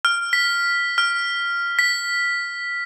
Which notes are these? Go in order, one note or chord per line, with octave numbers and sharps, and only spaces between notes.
F6
B6
F6
B6